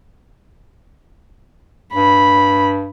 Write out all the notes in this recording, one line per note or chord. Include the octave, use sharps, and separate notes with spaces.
G2 B5